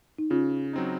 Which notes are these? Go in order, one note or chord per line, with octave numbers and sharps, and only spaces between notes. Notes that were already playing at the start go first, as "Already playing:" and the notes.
D#4
C#3 C#4 F4
F#3 C4 D#4